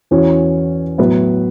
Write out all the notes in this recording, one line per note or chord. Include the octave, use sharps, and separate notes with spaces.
E2 E3 C#4 F#4 C#5
A2 F#3 B3 E4 B4